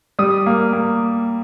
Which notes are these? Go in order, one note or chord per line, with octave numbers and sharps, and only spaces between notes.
G3 D#6
A#3
A#3